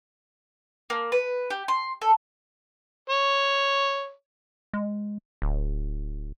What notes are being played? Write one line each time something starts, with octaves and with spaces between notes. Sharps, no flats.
A#3
B4
G4
C6
A4
C#5
G#3
D1